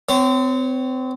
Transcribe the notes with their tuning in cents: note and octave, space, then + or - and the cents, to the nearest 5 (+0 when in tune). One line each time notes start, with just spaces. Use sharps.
C4 -30 C#5 +0